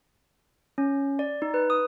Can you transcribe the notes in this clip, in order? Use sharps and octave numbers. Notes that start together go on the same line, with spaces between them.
C#4
D5
D#4
B4
D#6